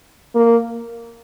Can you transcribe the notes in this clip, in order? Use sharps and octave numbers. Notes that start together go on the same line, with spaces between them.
A#3